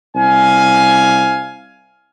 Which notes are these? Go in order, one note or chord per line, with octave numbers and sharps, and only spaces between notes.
C2 F5 G#5